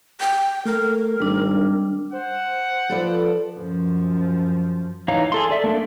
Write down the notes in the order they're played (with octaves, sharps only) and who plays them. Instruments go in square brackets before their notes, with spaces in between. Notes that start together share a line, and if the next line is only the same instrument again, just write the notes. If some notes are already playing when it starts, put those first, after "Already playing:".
[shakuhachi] G5
[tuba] A3 [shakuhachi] A#4
[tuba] G#1 [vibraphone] G3 D4
[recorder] C5 [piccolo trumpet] F#5
[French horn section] F3 [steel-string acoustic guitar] A4 B4 D5
[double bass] F#2 F3
[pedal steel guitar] E3 D#4 C#5 F5 A#5
G#4 A4 C6
A4 D5 E5
A3 A#3 D4 A4